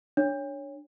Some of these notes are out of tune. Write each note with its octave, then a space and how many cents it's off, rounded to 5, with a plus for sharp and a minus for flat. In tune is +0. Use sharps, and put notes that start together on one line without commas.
D4 +0 C#5 +0